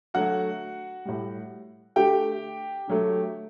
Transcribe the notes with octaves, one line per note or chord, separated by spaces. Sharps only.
D3 F#3 A3 F#4 F#5
A2 G3
D3 A3 G4 G5
D3 F#3 A3